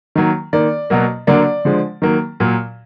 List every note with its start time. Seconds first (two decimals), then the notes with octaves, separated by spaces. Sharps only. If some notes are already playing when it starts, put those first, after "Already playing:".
0.15 D#3 F#3 A#3
0.53 D#3 A#3 D5
0.90 B2 F#3 A#3
1.27 D3 F#3 A#3 D5
1.65 D3 F3 G#3
2.02 D#3 F#3 A#3
2.40 A#2 F#3 A#3